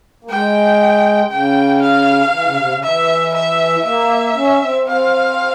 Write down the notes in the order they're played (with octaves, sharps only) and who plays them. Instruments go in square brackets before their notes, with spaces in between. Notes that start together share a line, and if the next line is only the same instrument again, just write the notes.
[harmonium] A#3
[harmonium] G#3 [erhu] G5
[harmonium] C#3 [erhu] G5
[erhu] F5
[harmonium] E3
C#3
C3
C#3
[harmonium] E3 [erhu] E5
[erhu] E5
[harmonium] A#3 [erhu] E5
[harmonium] C#4
C4
[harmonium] C4 [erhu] F5